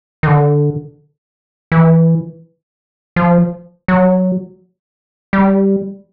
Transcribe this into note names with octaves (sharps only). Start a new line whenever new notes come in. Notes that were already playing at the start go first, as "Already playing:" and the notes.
D#3
D3
E3
F3
F#3
G3